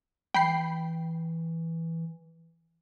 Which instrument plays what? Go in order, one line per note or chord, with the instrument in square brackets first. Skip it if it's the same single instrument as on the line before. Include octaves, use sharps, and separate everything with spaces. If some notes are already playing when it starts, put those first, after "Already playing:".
[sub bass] E3 [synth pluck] G5 B5 C7